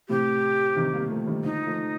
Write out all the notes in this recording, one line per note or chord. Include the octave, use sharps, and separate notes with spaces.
A2 C3 G4
C3 D#3
G3 A#3
F3 A3
D#3 G3
D3 F3 D#4
F3 A3